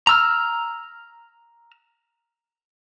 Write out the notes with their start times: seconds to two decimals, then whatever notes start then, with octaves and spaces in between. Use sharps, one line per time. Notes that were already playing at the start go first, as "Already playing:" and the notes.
0.07 A#5 E6 F6